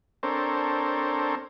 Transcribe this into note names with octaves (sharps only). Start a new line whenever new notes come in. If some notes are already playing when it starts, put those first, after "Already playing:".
C4 D4 A4 A#4 C5 C#5